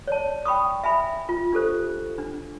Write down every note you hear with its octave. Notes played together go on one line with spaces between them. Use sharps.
C#5 D5 A5
G5 B5 C#6 D#6
E5 G#5 B5
F4
D4 G4 A4 C5
D4